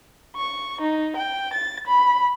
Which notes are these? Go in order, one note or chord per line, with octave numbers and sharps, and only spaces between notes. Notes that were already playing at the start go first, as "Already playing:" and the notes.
C#6
D#4
G5
A6
B5